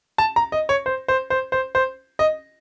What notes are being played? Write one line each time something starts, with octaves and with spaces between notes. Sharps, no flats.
A5
A#5
D#5
C#5
C5
C5
C5
C5
C5
D#5